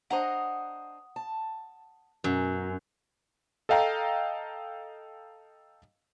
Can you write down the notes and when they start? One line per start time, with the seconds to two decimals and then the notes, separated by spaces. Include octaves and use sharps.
0.10 D4 C5 D#5 F#5 A#5 D#6
1.16 A5
2.24 F#2 B2
3.69 A4 D#5 F5 G5 A#5